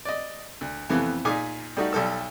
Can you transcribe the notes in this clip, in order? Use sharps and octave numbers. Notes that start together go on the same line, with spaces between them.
D5 D#5
D2
F2 C3 E3 A3 B3 G#5
A#2 D#4 G#4 G#5 D6
G3 A3 D#4 F#4
B1 G3 A4 E6